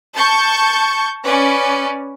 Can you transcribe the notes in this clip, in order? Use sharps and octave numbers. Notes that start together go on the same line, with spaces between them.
A5 C#6 G6
C#4 B4 D5